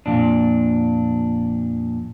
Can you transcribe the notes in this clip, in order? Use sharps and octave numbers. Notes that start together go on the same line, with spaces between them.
F2 A#2 D4